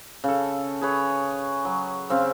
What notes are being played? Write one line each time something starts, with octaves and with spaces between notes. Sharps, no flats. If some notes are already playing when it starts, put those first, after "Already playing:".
C#3 A4
G#4 B4 C#5
F#3
C#3 C4 G4 F5